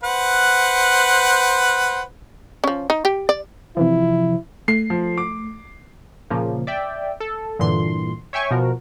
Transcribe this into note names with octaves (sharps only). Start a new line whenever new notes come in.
B4 C5 F#5
F3 C#4
D#4
G4
D5
C3 E3 F3 E4
A3 C7
F3
D6
A#2 C#3 F3 A#3
D5 E5 G5
A4
G2 A#2 D3 E3 C6
C#5 E5 G5 G#5 C#6
B2 F3 F#4 A#4